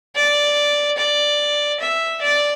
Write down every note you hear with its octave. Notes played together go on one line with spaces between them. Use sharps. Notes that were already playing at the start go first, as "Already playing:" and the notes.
D5
D5
E5
D5